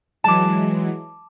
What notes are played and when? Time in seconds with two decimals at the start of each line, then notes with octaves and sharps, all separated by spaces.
0.24 E3 F#3 G#3 A5 D6